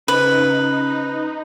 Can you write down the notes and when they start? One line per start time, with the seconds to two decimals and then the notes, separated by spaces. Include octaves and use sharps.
0.08 C#3 D#4 B4 C5